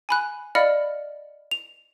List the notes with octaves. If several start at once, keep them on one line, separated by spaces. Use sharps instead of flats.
G#5 B5 F#6
D5 D#5 F5 B5 F6 C#7
F7